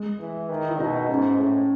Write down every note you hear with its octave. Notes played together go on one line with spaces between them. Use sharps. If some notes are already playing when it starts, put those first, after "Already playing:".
Already playing: G#3
E3
D#3
E4
B2 D#4
G#2 C#4
A2